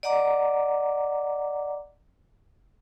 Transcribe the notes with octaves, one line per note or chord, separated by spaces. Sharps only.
D5 D#5 F#5 A#5 D6